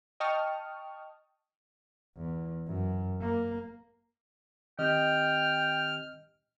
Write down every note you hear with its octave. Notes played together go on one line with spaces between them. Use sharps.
D#5 G5 A5 C#6 D#6 F6
E2
F#2
A#3
D#3 C4 G4 D#5 G5 F6